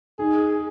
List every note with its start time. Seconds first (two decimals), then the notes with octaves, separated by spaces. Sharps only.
0.19 D#4 G#4